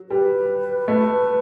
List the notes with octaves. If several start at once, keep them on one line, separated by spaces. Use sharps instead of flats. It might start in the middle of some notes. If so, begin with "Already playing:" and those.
Already playing: F#3
G3 B4
A3